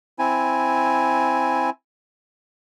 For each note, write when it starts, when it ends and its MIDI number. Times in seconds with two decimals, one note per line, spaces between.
0.19 1.70 60
0.19 1.70 64
0.19 1.70 80